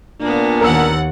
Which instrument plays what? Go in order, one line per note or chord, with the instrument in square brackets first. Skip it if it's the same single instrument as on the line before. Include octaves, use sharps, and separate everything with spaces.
[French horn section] A#2 D4 [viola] A#3 B3
[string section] D#2 F#5 [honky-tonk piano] A#4 A#5 E6